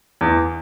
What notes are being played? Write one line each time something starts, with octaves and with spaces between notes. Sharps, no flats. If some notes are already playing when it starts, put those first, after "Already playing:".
E2